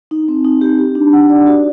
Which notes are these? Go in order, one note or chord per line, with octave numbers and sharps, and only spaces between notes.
D#4
C4
D#4
G4
G4
D4
F#5
D5
F#4